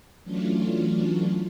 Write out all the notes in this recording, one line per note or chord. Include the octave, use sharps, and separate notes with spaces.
E3 F#3 A3 C#4 D4 F4